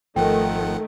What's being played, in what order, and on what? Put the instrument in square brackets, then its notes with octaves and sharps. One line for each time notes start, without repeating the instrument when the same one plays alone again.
[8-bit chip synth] G#1 F3 F#5 [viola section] D#3 A3 [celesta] G5